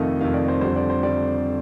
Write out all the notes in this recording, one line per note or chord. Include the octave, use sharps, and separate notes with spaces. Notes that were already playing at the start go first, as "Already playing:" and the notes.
Already playing: F2 C3 D#3 A3 D#5 F5
F2 C3 D#3 A3 F5
D5
C5
F2 D3 G3 C5
D5
C5
D3 G3 D5